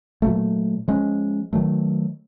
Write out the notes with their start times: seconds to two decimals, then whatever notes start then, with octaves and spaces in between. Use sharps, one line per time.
0.22 A#2 F#3 A3
0.88 F3 G#3 C#4
1.53 D#3 F#3 A3